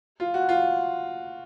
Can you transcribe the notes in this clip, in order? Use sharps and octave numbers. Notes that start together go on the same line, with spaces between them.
F4
F#4
F4